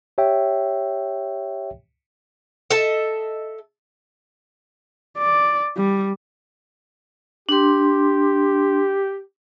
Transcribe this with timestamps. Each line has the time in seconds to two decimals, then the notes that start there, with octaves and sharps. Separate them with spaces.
0.18 G4 C#5 E5 G5
2.70 A4 D#5 E5 A5
5.17 D5
5.76 G3
7.49 D4 G4 C6